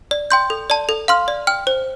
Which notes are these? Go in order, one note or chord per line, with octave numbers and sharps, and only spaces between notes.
D5
G5 C6 G6
A4
D5 A5
A4
F5 C6 F6
D5
G5 F6
C5